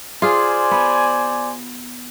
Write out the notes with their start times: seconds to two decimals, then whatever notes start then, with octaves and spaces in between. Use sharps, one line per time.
0.22 F4 G#4 C5 D5 G#5
0.71 B3